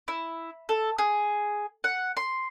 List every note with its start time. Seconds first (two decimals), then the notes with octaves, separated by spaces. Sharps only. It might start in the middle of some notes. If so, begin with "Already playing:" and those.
0.08 E4
0.69 A4
0.98 G#4
1.84 F#5
2.17 C6